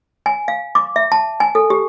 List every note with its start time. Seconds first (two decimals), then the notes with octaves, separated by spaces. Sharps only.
0.26 G#5
0.48 F5
0.75 D6
0.96 E5
1.12 A5
1.40 G#5
1.55 A4
1.70 G4